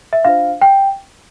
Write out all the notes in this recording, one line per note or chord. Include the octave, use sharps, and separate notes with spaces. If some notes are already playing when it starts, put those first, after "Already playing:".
E5
D4 F4 C5 F5
G5